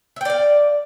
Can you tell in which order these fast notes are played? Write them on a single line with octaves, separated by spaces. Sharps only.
E5 G5 D5 F5